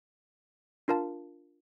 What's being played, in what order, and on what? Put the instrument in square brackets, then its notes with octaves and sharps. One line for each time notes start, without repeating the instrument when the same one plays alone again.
[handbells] D4 F4 A#4 F5 A5